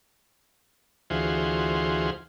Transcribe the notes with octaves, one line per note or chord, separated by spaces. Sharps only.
D2 E3 F4 F#4 G#4 C5